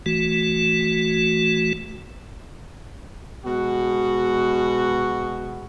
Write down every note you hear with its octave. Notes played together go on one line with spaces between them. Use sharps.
E3 A3 F#4
B2 G#3 F#4